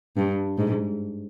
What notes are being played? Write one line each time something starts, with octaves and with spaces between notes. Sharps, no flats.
G2
G#2